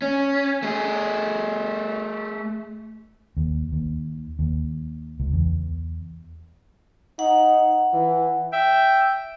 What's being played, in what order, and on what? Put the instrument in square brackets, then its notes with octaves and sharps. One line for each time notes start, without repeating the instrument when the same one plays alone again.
[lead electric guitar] C#4
A3 G#4
[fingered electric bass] D#2
D#2
D#2
C#2
E2
[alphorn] D#4 [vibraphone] F#5
[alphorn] E3
[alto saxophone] E5 [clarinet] G5